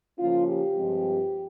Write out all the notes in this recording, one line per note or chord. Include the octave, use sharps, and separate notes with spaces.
C#3 F3 A#3 C#4 F4
G4
G2 F3 G#3 C4